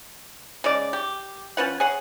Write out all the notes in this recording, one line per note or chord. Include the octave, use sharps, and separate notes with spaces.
C#3 G#3 D5
G4
F3 C#4 B4 F#5
G#4 C#5 F#5